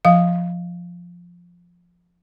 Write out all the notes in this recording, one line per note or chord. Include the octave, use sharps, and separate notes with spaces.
F3 F5